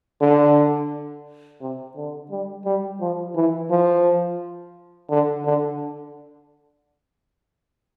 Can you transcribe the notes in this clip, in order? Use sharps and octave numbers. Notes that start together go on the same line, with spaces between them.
D3
C3
D3
G3
G3
F3
E3
F3
D3
D3